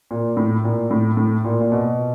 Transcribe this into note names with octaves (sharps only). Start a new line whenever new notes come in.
A#2
A2
A#2
A2
A2
A#2
A#2
B2